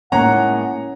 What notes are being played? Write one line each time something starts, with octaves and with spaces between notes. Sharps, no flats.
A2 G#3 A#3 C#4 F#5 A#5